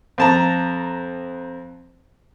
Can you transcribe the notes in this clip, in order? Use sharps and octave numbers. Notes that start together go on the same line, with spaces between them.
F2 A5 A#5